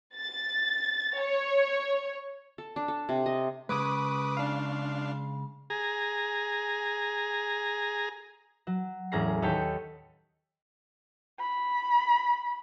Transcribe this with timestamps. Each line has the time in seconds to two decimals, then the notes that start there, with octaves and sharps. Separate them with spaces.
0.16 A6
1.19 C#5
2.58 A4
2.76 D4
2.88 A4
3.09 C3
3.26 D#5
3.69 C#3 G#3 B4 D6 D#6
4.37 D4 F5
5.70 G#4 A#5
8.67 F#3
9.12 E1 A2 C#4 G#4 A#5 C7
9.42 D#2 A4 C#5 G5 B6
11.40 B5